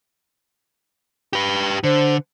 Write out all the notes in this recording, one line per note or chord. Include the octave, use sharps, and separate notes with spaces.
G4 B4
D3 C5